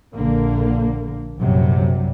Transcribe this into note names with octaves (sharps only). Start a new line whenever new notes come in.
A#1 D3 A#3
A#1 F#2 C3 F#3 G3